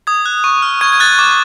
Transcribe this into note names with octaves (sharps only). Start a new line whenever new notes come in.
D#6 G#6
F#6
C#6
F6
C#6 G#6
G#6
F#6 A6
D6